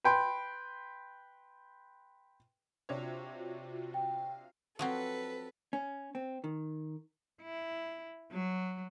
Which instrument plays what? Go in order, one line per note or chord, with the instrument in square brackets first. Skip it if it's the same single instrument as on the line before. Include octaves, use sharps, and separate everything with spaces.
[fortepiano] B4 G5 C6
[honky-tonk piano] C3 D4 C#5 [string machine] F4 F#4
[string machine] F5 [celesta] G5
[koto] F3 F#3 C4 [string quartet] A4 B4
[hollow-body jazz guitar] C#4
C4
D#3
[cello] E4
F#3